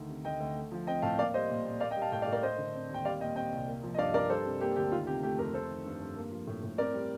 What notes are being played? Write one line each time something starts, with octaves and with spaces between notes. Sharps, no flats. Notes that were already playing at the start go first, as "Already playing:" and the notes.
Already playing: D2 D#3
C3
D2 D#5 G5
D2
A3
F3
C4 D#5 G5
A2 F5 A5
A#3 D5 F5
G3 C5 D#5
A#2
A#2
A#3 D5 F5
D#5 G5
G3
F5 A5
A2 D#5 G5
D5 F5
A2
A#4 D5
A3 C5 D#5
D3
C4
D#2
G5
G3 D5 F5
A#2 D#5 G5
C4 D#5 G5
C2
A#3
F3
D#5
G2 D5 F5
G2 A#4 D5
G3 A4 C5
C3
A#3 G4
D2 G4
D#3 F4
C3 G4
A3 G4
F2 G4 A#4
A3 A4 C5
D#3
G2
G2
A#3
F3
A2
A2
C4 A#4 D5
G3